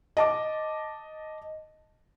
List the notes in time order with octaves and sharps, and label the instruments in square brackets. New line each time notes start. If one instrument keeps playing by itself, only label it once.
[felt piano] D#5 A5 D6